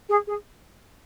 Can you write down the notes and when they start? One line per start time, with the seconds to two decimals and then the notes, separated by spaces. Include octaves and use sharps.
0.09 G#4
0.27 G#4